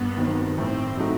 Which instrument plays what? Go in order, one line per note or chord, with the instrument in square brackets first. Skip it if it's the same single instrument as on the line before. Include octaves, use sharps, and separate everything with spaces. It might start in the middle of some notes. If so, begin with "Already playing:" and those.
Already playing: [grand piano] G2 [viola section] B3
[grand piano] D#3 F#3 C4 D#4
[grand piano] A2 [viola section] C4
[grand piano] F#3 A3 D#4 F#4